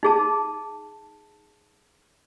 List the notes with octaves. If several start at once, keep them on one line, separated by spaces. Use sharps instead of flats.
D#4 G#4 A5